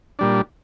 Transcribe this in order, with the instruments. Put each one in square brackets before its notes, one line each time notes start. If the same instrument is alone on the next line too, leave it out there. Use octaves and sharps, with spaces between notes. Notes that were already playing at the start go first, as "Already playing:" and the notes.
[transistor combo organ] A#2 G3 D4